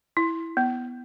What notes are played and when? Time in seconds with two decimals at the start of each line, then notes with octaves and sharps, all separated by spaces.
0.17 E4
0.57 B3